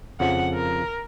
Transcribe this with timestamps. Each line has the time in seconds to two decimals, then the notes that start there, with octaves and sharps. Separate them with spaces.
0.20 F2 C#3 F3 F#5
0.54 A#4